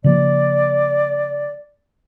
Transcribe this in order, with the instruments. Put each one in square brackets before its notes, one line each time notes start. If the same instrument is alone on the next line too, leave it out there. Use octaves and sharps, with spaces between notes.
[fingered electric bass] C#3 F3 A#3 [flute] D5